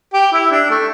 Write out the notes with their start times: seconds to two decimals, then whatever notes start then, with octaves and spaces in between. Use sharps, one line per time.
0.13 G4
0.32 E4
0.51 D4
0.70 A3